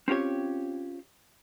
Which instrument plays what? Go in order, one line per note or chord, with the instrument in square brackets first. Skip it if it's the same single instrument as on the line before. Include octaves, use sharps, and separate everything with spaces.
[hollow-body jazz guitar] C4 C#4 F4 G4 C#5